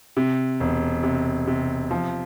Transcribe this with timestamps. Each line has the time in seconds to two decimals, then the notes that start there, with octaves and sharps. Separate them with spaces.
0.17 C3
0.60 E1
1.03 C3
1.47 C3
1.91 F3